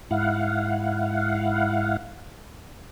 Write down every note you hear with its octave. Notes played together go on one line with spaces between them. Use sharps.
G#2 E4 F5 F#5